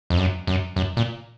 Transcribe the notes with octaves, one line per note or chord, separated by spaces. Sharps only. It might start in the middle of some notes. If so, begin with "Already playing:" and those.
F2
F#2
F#2
F#2
A#2